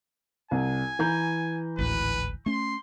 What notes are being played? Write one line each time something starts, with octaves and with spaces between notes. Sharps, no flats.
C2 G#5
E3 A#5 G6
G#1 D2 A2 B4
A3 C#4 C6